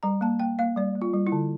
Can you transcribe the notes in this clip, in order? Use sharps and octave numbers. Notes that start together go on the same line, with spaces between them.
G3 A#5
A#3 A5
A#3 G5
A#3 F5
G3 D5
A#3
F4
G3
E4
D3